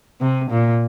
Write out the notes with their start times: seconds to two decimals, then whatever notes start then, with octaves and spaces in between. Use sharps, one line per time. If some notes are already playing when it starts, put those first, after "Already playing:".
0.21 C3
0.51 A#2